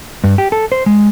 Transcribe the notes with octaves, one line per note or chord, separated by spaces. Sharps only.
G2
G4
A4
C5
G#3